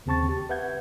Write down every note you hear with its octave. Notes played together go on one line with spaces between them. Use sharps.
D#2 C#3 C4 A5 C#6 A6
G4
B4 E5 F#5 G6 G#6